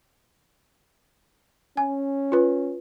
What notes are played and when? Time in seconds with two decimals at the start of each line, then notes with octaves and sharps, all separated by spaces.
1.77 C#4 G#5
2.32 F4 B4